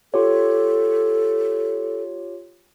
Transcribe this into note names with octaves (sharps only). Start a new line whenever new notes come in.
F4 G4 A4 C#5